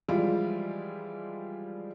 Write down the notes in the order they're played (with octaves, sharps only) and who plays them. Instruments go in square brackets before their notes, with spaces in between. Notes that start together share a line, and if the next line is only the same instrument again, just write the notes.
[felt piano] E3 F3 G3 G#3 E4 F4